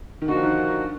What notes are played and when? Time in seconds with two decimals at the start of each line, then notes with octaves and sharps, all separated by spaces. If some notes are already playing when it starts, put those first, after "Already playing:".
0.22 D#3
0.28 D3 F3 A#3 D#4 F#4
0.44 D#3